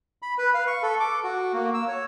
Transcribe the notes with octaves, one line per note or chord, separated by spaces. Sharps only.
B5
B4
F5
C#6
A4
D6
F#4
A#3
E6
C#5